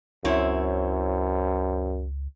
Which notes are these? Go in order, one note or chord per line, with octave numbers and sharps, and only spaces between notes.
C#2 F#2 C4 E4 C#5